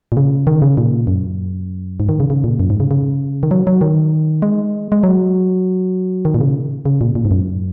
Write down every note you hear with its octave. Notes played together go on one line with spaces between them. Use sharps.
A#2
C#3
D#3
C#3
A#2
F#2
G#2
D#3
C#3
C#3
A#2
F#2
G#2
C#3
C#3
D#3
F#3
F#3
D#3
G#3
G#3
F#3
D#3
A#2
C#3
C#3
A#2
A#2
G#2
F#2